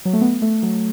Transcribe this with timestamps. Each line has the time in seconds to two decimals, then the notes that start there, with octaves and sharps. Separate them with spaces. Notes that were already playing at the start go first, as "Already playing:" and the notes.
0.05 F#3
0.13 A3
0.21 B3
0.42 A3
0.63 F#3